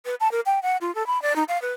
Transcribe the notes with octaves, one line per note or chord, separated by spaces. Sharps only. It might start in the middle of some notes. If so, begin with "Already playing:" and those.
B4
A5
A#4
G5
F#5
F4
A4
B5
D5
D#4
F5
B4